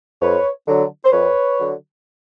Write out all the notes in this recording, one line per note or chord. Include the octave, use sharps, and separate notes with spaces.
F2 B4 C#5
D3 F#3
C5
F2 B4 C#5
D3 F#3